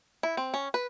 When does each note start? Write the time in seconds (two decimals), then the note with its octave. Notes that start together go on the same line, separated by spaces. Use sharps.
0.23 E4
0.37 C4
0.54 C#4
0.74 B4